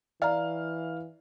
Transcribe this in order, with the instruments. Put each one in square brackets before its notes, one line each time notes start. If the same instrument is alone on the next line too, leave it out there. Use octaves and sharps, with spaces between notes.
[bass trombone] E3 [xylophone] D5 A#5 [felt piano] F5 F6